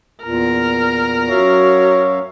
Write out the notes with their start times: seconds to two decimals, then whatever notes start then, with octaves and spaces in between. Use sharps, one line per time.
0.24 E2 A#2 A#4
1.29 F#2 F#4 C#5 E5 F5